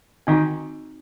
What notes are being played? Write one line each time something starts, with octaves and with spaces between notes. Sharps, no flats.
D#3 C4 D#4 F#4